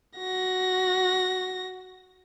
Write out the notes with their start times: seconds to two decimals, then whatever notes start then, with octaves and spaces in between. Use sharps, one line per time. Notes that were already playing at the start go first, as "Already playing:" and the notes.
0.18 F#4 A#6